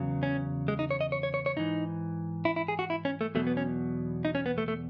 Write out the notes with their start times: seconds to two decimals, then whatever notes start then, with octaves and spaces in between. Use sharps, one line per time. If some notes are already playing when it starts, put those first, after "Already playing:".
Already playing: E2 C#3 F#3
0.23 C#4
0.68 G#3
0.79 D#4
0.91 C#5
1.01 D#5
1.12 C#5
1.23 C#5
1.34 C#5
1.46 C#5
1.57 G#2 E3 D#4
2.45 E4
2.56 E4
2.68 G#4
2.79 F#4
2.90 E4
3.05 C#4
3.21 A3
3.35 E2 B2 F#3 A3
3.47 B3
3.57 C#4
4.25 D#4
4.35 C#4
4.46 B3
4.58 A3
4.68 A3